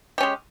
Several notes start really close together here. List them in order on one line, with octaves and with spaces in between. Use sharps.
G4 C#4 G#3